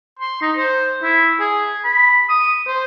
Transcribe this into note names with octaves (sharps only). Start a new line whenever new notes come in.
C6
D#4
C5
E4
G#4
B5
D#6
C5